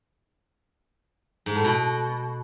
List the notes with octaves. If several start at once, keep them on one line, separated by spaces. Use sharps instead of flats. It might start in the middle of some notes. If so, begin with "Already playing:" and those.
G#2
A2
B2